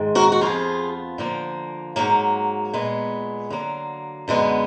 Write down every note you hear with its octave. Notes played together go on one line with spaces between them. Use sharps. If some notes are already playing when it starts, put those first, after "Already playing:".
Already playing: G#2 D#3 G#3
F#4 A#4
F#4
F2 F3 B3 F4 G#4
D3 F3 A#3
G#2 F#3 A#3
A#2 G#3 B3
D3 F#3 A#3
F#2 D3 G#3 B3